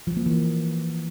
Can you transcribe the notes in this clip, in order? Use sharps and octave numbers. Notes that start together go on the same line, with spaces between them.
F3
A#3
E3